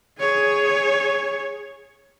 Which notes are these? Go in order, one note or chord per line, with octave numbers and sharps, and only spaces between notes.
G#4 C#5